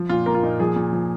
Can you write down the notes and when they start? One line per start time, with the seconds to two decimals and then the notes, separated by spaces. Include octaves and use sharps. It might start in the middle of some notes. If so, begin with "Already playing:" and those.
Already playing: F3
0.09 A#2 F4
0.26 A#3 A#4
0.35 F4
0.43 A#2 D#4
0.60 F3 G#4
0.76 A#2
0.93 F3